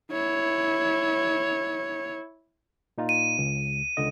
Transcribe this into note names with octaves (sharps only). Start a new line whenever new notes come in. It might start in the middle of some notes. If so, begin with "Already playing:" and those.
E4 C#5
A#2 D#4 F4
D#7
C#2
C#2 D3 D#5